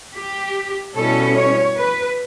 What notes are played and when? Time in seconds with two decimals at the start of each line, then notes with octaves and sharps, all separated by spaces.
0.14 G4
0.95 B2 G3 C#4 E4 A4
1.36 C#5
1.76 B4